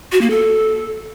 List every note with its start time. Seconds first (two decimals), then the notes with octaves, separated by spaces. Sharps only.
0.12 F#4
0.21 A#3
0.30 A4